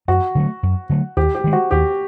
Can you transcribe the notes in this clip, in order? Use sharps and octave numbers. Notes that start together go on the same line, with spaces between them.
F#2 F#4
D3 F#3 A3
F#2
D3 F#3 A3
D#2 G4
G4
D#3 G#3
F#4
D#2 G4